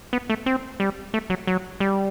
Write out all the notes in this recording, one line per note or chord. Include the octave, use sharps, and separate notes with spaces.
B3
A3
C4
G3
A3
F#3
F#3
G3